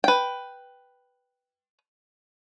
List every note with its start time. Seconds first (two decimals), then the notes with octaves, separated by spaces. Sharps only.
0.04 B4 G5